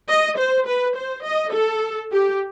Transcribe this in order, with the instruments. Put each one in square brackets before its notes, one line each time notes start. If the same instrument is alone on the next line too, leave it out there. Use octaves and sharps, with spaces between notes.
[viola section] D#5
C5
B4
C5
D#5
A4
G4